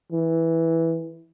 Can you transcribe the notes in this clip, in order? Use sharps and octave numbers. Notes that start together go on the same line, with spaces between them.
E3